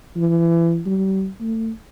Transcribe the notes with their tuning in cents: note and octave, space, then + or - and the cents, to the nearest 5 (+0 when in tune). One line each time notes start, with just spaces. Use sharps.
E3 +30
G3 -40
A3 +30